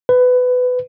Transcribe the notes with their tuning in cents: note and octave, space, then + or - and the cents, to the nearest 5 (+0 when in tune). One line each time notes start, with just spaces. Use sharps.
B4 +20